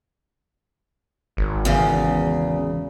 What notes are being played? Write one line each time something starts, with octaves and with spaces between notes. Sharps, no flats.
G#1
E2 C#3